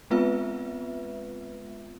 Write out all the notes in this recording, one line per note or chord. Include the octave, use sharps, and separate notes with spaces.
G#3 B3 C4 F4 B4 E5